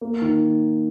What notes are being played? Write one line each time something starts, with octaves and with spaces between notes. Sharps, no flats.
A#3
D#3